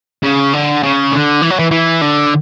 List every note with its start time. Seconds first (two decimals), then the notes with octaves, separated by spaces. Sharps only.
0.23 C#3
0.53 D3
0.83 C#3
1.12 D3
1.42 E3
1.50 F#3
1.59 E3
1.71 E3
2.01 D3